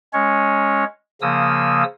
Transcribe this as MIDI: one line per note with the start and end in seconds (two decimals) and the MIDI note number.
0.13 0.84 56
0.13 0.84 61
0.13 0.84 73
1.22 1.84 49
1.22 1.84 53
1.22 1.84 58
1.22 1.84 87
1.22 1.84 88